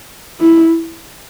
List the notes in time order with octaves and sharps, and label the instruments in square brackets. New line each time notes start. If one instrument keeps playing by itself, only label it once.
[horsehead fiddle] E4